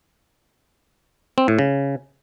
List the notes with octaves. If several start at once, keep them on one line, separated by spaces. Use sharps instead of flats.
C4
A2
C#3